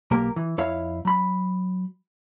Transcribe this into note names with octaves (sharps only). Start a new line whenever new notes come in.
B1 A#3 G4 A#4
E3
F2 E4 C#5 E5 F5
F#3 B5